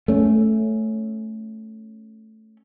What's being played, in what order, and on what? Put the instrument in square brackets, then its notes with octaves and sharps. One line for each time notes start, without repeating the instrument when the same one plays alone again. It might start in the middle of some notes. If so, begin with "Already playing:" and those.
[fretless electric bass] A3 C#4